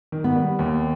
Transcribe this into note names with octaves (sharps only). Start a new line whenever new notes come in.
D#3
B3
G3
D#2